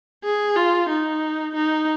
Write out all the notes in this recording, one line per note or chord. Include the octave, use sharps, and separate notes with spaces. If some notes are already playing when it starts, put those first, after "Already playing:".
G#4
F4
D#4
D#4